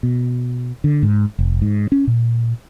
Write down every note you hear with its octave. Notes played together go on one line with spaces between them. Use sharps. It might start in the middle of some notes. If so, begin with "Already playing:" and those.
B2
D3
G#2
F1
G#2
C#4
A#2